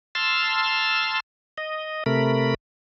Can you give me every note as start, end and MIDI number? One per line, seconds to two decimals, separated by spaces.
0.15 1.20 81
0.15 1.20 84
0.15 1.20 88
0.15 1.20 89
1.58 2.04 75
2.06 2.54 48
2.06 2.54 57
2.06 2.54 70
2.06 2.54 83